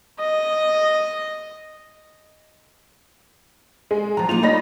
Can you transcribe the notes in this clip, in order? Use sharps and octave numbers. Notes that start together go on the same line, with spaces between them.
D#5
G#3
F3 F#3 A#5
A#3 D#4 F4 F7
G3 D#4 C#5 D#5 B5 A#6